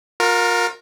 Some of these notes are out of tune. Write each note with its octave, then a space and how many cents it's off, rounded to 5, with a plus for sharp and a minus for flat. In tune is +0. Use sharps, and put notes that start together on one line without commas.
F4 +40 A#4 +0